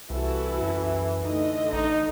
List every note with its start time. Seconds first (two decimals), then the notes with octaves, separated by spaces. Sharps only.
0.10 C2 E3 E4 F#4 A4
0.62 F#2
1.25 D3 A3 D#4 D#5
1.73 A1 D#4